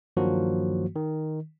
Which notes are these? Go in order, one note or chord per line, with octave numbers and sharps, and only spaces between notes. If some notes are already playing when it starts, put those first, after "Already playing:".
G2 D#3 F3 F#3 A#3 F#4
D#3